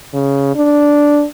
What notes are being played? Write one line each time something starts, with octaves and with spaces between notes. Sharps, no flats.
C#3
D4